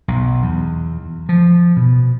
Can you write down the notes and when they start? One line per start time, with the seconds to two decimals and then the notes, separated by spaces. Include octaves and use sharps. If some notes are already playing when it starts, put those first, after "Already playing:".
0.08 B1
0.42 E2
1.29 F3
1.77 B2